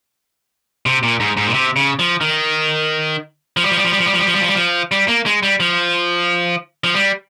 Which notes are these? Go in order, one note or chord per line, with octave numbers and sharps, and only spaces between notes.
C3
A#2
G#2
G#2
A#2
C3
C#3
F3
D#3
F3
G3
F3
G3
F3
G3
F3
G3
F3
G3
F3
G3
F3
G3
F3
G3
A#3
G#3
G3
F3
F3
G3